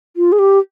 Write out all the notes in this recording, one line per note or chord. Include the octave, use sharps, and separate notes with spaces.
F4
G#4
G4